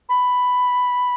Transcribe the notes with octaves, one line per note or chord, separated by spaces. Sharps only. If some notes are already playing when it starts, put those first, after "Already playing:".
B5